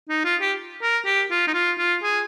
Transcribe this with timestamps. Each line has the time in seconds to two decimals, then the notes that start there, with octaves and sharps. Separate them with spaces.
0.09 D#4
0.25 F4
0.41 G4
0.82 A#4
1.05 G4
1.31 F4
1.47 D#4
1.54 F4
1.78 F4
2.03 G#4